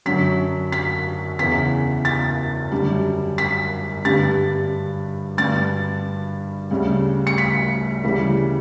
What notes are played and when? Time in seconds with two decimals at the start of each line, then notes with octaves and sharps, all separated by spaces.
0.06 F#2 D3 F#3 B6
0.72 B6
1.39 E2 C#3 E3 B6
2.05 A6
2.71 F#2 D3 G3
3.38 B6
4.05 G2 D3 G3 A6
5.37 G2 D3 G3 A6
6.71 D2 C#3 G3
7.27 C#7
7.38 B6
8.04 D2 C#3 E3 G3